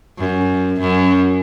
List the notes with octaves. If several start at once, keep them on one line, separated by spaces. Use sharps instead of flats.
F#2
F#2